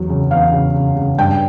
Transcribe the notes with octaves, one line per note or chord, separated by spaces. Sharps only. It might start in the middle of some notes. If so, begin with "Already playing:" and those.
Already playing: E2 F#3
C#3
E2 F5
C#3
C#3
C#3
G2 G5